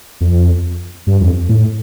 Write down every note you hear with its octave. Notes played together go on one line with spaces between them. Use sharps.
F2
G2
F2
A2